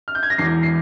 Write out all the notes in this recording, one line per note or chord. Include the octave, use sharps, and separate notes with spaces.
F6
G6
G#6
A#6
E1 E2 E3 C7
C7